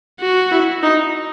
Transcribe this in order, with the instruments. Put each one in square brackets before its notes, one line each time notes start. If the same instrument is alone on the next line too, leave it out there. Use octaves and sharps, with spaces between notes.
[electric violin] F#4
[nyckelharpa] E4
D#4